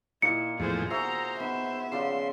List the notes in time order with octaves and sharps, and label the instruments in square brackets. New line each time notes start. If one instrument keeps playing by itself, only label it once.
[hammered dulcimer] A#2 D#4 [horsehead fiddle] E4 [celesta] C#7
[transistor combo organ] E2 A2 F3 [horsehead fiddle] G#4 C5
[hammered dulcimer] F#4 G#4 E5 [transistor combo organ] C5 [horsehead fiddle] A#5
[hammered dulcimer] B3 D#4 [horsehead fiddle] E5
[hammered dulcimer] C#3 F3 D5 [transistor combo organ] C6